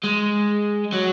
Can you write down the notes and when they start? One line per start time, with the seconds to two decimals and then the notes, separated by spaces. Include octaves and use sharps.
0.04 G#3
0.93 F#3